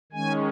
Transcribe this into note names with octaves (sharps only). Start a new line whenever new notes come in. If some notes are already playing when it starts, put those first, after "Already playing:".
D#3 G#3 C#4 G#5